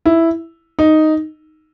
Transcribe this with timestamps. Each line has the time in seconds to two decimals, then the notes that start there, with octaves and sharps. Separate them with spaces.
0.06 E4
0.79 D#4